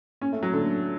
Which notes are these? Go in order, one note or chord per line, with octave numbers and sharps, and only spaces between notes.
C#4
A3
F#3
D3